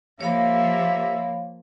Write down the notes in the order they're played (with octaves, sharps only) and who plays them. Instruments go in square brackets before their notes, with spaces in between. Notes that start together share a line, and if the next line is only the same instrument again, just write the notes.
[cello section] F3 A#3 [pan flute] G4 [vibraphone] C#5 F5 B5 [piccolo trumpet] E5